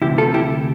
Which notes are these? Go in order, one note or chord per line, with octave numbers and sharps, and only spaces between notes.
D2 C3 E3 E4 G4
F4 A4
E4 G4